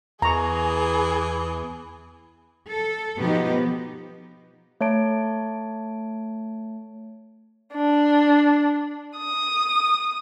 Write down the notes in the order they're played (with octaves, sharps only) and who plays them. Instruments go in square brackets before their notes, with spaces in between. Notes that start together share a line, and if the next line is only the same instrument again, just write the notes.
[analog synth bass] E2 [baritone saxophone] E3 [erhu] G#4 [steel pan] A#5 C#6
[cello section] A4
B2 F3 B3 D#4 G4
[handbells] A3 C#5 A5 D7
[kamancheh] D4
D#6